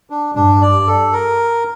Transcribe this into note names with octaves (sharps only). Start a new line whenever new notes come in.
D4
G2 D4
D5
A4
A#4